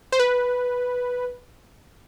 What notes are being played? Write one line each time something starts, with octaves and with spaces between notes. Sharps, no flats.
C5
B4